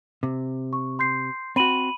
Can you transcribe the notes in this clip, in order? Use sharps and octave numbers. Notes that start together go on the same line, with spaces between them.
C3
C#6
C6 G6 C7
C4 F#4 B5 D#7 F#7